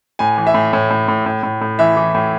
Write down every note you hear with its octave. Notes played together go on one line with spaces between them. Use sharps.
A2 G#5
E3
E5
A2
A2
A2
A2
A2
A2
A2
E3 E5
E3
A2